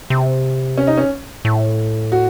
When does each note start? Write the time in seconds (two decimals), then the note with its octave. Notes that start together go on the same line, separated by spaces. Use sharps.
0.10 C3
0.77 C#4
0.87 D#4
0.97 C#4
1.45 A2
2.12 F#4